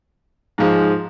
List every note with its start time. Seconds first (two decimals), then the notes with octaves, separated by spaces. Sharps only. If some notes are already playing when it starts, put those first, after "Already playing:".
0.58 G#2 F3 G#3